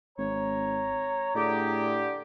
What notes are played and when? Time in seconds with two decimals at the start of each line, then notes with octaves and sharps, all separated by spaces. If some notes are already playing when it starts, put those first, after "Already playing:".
0.18 G#1 C#5 A#5
1.35 A2 D3 G4 G#4